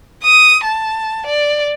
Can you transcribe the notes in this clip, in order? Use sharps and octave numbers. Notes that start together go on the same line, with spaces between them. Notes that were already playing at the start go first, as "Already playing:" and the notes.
D#6
A5
D5